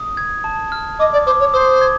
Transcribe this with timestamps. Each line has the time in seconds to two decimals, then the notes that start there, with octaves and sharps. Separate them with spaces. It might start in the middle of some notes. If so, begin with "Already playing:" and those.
Already playing: D#6
0.17 G#6
0.44 A5
0.72 F6
0.99 D#5 D6
1.13 D5
1.26 C5 D6
1.40 C#5
1.53 C5 D#6
1.81 G#6